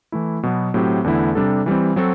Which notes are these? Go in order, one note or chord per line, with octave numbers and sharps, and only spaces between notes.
E3 A3 E4
B2 F#3 B3
A2 F#3 C4 G4
E2 D3 A3 E4
C3 G3 D4 A4
E3 G3 C4
F#3 C4 F#4 A4